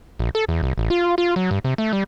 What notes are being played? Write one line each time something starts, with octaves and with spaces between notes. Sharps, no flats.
A#1
A4
E2
C2
A1
F4
F4
F#3
G2
C3
A3
G3